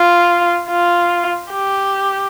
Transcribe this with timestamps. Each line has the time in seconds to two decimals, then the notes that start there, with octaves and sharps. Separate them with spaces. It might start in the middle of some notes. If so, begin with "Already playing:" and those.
Already playing: F4
0.69 F4
1.50 G4